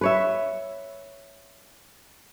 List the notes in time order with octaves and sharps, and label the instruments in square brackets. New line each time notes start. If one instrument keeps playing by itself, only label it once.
[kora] B4 C#5 E5